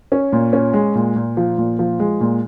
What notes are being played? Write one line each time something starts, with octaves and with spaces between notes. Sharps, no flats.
C#4
A#2
C#4
G#3
A#2
A#2
F3
A#2
F3
G#3
A#2